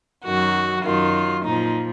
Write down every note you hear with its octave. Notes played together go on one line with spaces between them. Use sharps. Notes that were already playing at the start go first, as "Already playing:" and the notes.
F#2 D#3 F#3 F#4
F#2 D#3 F#3 F4
A#2 F3 D#4